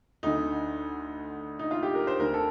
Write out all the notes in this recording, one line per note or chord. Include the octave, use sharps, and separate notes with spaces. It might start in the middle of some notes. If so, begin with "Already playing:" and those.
D2 D3 D#4
D#4
F4
G4
A#4
C5
D2 D3 A#4
A4